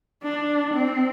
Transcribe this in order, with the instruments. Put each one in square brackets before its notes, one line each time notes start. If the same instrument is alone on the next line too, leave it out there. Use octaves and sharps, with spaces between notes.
[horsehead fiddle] D4
C4